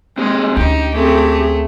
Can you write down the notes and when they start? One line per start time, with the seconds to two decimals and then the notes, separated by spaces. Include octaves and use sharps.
0.18 G#3 C4 G4 G#4
0.57 D2 C#4 D#4 G4
0.94 A3 C4 G#4